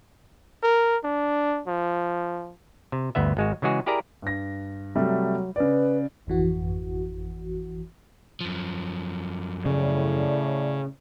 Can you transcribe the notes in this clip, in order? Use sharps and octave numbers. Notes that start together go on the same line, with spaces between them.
A#4
D4
F3
C3
G1 D2 B3 E5
G#1 G#3 F#4
C#3 E3 G#3 F#4 G#4
E4 G4 G#4 A#4 D5 A#5
G2 A#6
C3 F#3 G3 A3
C#3 B4 D5
G#1 F2 E3 F#4
F#2 F3
A2 C#3 D5